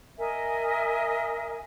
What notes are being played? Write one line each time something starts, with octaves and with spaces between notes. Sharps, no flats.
A#4 D#5 E5 G#5